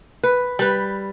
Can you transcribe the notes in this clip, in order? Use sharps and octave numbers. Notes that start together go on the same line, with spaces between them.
B4
G3 B4